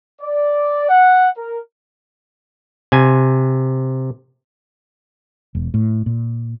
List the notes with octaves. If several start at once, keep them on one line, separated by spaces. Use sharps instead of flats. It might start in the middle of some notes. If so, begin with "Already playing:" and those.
D5
F#5
A#4
C3 G#5
E1
A2
A#2